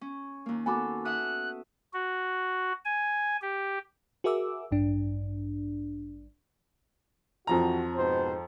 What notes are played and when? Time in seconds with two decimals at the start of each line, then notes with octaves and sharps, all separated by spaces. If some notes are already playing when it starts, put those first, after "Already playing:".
0.01 C#4
0.46 D#2 A#3
0.66 B3 F#4 A4 G#5 B5 D6
1.05 E5 F#5 D#6 F#6
1.94 F#4
2.85 G#5
3.41 G4
4.24 F#4 G#4 A#4 E5 D6 E6
4.71 A1 G2 D4
7.47 F2 E3 F3 F#4 A#5
7.96 G#2 B2 C5